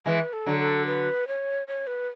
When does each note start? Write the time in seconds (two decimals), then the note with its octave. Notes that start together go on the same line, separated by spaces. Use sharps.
0.06 E3 G#3 B4
0.33 A4
0.46 D3 F#3
0.59 A4
0.86 B4
1.28 C#5
1.68 C#5
1.87 B4